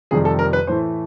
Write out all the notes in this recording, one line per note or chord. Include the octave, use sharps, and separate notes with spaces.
F2 C3 D#3 G3 G#4
A4
A#4
B4
A2 E3 A3 C5